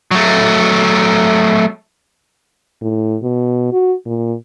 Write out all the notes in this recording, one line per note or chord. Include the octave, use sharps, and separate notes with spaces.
F#3 A3
A2
B2
F#4
A#2